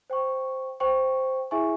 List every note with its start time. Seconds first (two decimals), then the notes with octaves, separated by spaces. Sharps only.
0.10 C5 G5 C#6
0.80 C5 G5 C#6
1.51 E4 G#4 E5 G#5 C#6